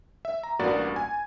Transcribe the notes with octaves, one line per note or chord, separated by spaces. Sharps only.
E5
A#5
A1 G2 A#3 F#4 D5 A6
G#5